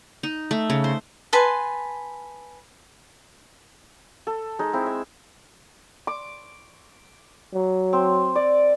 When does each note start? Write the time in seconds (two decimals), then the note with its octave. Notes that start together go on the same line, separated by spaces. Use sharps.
0.23 D#4
0.51 A3
0.70 C#3
0.84 C5
1.33 B4 G#5 A5 C6
4.27 A4
4.59 G#3 D#4
4.73 C4 E4
4.86 E5
6.07 D6
7.54 F#3
7.93 C4
8.36 D5